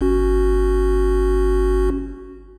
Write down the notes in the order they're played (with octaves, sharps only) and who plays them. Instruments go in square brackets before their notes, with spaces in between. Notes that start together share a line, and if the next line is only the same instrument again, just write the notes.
[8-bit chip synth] G1 C#4 F#4